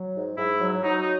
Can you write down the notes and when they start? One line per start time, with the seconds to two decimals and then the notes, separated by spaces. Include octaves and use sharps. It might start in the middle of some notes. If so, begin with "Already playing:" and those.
Already playing: F#3
0.14 G#2
0.37 G#2 E4
0.60 F#3
0.83 F#3 D#4
1.02 D#4